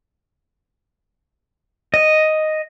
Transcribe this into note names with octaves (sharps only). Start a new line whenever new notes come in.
D#5